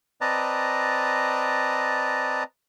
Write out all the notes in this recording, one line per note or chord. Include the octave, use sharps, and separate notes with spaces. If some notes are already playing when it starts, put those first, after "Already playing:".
C4 B4 D5 D#5 A5 A#5